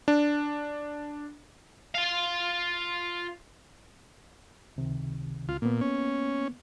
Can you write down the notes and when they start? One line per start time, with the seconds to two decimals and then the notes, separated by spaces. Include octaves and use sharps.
0.08 D4
1.94 F4 F5
4.76 C#2 C3 D#3
5.49 C#2 F4
5.62 A#2 A#3 B3
5.81 C#4